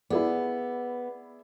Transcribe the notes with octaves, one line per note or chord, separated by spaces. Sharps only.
B3 E4 G#4 D5